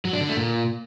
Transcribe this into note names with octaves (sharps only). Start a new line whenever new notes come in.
F#3
D4
D3
A3
A#2